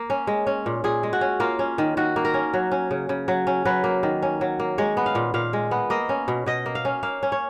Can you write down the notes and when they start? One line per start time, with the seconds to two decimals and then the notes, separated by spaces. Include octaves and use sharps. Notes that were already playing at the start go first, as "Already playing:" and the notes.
Already playing: A#3
0.10 C#4
0.27 G#3
0.47 C#4
0.66 A#2
0.84 A#2 G#4
1.03 G#3
1.13 F#4
1.21 C#4
1.40 A#3 F4
1.59 C#4
1.78 D#3
1.97 D#3 F#4
2.16 A#3
2.25 A#4
2.34 C#4
2.54 F#3
2.72 C#4
2.91 C#3
3.09 C#3
3.28 F#3
3.47 C#4
3.65 F#3 B4
3.84 A#3
4.03 D#3
4.22 C#4
4.41 F#3
4.60 A#3
4.78 G#3 C#5
4.97 B3
5.06 F5
5.15 A#2
5.34 A#2 F5
5.53 G#3
5.71 B3
5.90 A#3 D#5
6.09 C#4
6.28 B2
6.46 B2 D#5
6.66 A#3
6.75 F5
6.85 C#4
7.03 A#3 F5
7.23 C#4
7.32 C#5